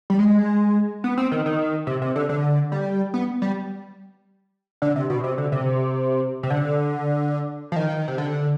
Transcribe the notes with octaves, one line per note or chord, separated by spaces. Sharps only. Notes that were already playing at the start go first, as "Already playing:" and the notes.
G3
G#3
B3
C4
D#3
D#3
C3
C3
D3
D3
G3
B3
G3
D3
C3
B2
C3
D3
C3
C3
D3
F3
D#3
C3
D3